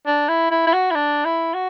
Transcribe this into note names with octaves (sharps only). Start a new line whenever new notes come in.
D4
E4
E4
E4
F#4
E4
D4
E4
F#4